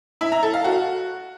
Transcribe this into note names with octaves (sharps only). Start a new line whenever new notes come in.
E4
A#5
A4
F5
F#4